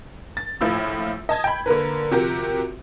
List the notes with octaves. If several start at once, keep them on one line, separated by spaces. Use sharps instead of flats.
A6
A#1 A2 F4 E6
D#5 A5 G#6
G5 B5
D3 A#3 A#4 B4
C3 F3 F#4 G4 A#4